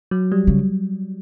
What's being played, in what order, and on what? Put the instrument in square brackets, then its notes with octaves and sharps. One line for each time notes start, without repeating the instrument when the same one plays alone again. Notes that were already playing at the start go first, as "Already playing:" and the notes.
[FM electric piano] F#3
G3
[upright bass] C#3